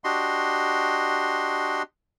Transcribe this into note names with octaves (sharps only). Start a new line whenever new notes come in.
D4 F#4 G4 D#5 C6